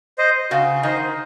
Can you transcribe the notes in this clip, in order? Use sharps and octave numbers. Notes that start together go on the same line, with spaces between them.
C5 D#5
C#3 F#4
D#3 C5 D#5